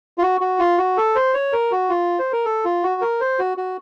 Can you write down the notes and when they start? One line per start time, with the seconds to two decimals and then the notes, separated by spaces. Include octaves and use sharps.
0.18 F4
0.22 F#4
0.41 F#4
0.59 F4
0.78 F#4
0.97 A4
1.15 C5
1.34 C#5
1.53 A#4
1.72 F#4
1.90 F4
2.19 C5
2.33 A#4
2.45 A4
2.65 F4
2.83 F#4
3.01 A#4
3.21 C5
3.39 F#4
3.57 F#4